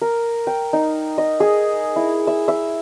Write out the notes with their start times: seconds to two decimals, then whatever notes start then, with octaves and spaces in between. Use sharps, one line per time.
0.02 A#4
0.47 G5
0.73 D#4
1.18 D#5
1.40 G#4
1.96 E4
2.27 E5
2.48 E5